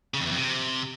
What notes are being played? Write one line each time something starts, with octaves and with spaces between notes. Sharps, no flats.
C#3
F2
E2
F2
C3